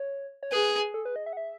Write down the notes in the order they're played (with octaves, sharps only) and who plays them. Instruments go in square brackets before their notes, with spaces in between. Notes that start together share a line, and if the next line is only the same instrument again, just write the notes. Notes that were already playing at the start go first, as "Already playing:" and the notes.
Already playing: [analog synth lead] C#5
C#5
[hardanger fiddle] G#4 [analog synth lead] B4
[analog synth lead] A4
B4
D#5
E5
F#5
E5